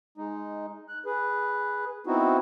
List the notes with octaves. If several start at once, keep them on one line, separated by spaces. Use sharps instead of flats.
G#3 D#4
F#6
G#4 B4
B3 C4 D#4 E4 F#4